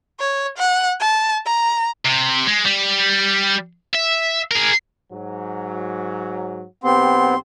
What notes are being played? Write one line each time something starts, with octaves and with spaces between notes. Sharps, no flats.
C#5
F#5
A5
A#5
C3
G#3
G3
E5
G#4 A#4
G#2 F#3
B1 B3 C4 G4 C6